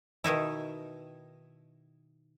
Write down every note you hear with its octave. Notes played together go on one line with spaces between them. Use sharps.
B2 D#3 D#4 E4